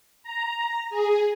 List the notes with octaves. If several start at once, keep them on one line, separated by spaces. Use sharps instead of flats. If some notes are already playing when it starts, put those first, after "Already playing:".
A#5
G#4